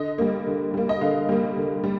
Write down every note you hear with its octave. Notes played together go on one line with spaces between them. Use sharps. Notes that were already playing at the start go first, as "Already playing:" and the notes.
Already playing: D3 D#5
G3 A#3
D3
G3 A#3
D#5
D3 F5
G3 A#3
D3
G3